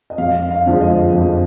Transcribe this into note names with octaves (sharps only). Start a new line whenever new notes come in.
D#5
F2 F5
F5
D3 F3 G#3
D#5
F2